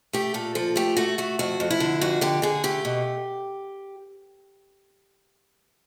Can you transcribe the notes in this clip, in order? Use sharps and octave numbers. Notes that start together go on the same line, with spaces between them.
A3 G4
A#2 A4
F3 A4
A3 G4
A3 F#4
A3 F#4
F2 F#4
F2
E4
D3
F2 F#4
D3 G4
D3 G#4
A3 G4
B2